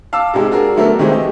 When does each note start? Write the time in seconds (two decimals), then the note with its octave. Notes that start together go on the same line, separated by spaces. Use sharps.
0.13 F5 A5 D6 E6
0.34 G#2 C3 G#3 G4
0.51 D4 F#4 G#4 A#4
0.76 D3 F#3 A3 B3 A4 A#4
0.99 C3 D#3 E3 G#3 A3 C4
1.12 G4 D#5